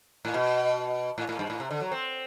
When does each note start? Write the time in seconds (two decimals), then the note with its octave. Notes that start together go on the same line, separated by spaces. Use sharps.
0.25 A2
0.34 B2
1.18 A2
1.29 A2
1.39 G2
1.50 A2
1.60 C3
1.71 D3
1.81 F#3
1.92 C4